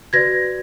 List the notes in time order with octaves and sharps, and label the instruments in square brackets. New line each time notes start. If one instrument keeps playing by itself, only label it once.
[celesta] F#4 B4 D5 G#6 A#6